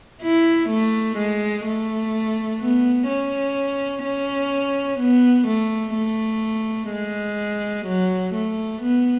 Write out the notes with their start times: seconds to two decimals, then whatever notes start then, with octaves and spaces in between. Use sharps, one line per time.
0.22 E4
0.70 A3
1.18 G#3
1.65 A3
2.61 B3
3.08 C#4
4.04 C#4
5.00 B3
5.48 A3
5.95 A3
6.91 G#3
7.87 F#3
8.35 A3
8.82 B3